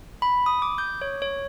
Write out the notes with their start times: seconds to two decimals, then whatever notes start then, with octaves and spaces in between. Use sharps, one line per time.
0.22 B5
0.46 D#6
0.62 D6
0.78 G6
1.01 C#5
1.22 C#5